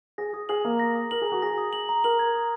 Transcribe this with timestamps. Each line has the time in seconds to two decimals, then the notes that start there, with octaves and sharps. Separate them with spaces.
0.18 G#4 A#6
0.34 G#4 D#6
0.49 G#4 F#7
0.65 A#3 A#5
0.79 A#6
0.95 D#6
1.11 A#4 F#7
1.22 G#4 A#5
1.32 F#4
1.42 G#4 A#6
1.58 D#6
1.73 F#7
1.89 A#5
2.04 A#4 F#7
2.19 G#6
2.35 D#6